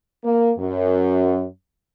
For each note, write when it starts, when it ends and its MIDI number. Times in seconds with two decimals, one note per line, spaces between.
0.24 0.51 58
0.58 1.44 42